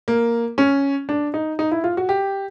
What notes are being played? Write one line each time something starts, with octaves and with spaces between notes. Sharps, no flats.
A#3
C#4
D4
D#4
D#4
E4
F4
F#4
G4